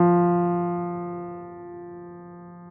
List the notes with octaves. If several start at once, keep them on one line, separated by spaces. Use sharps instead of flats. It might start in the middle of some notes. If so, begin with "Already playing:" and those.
Already playing: F3